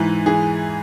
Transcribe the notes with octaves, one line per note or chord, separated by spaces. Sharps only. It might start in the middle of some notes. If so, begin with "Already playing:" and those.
Already playing: G#2 E3
E3 G#4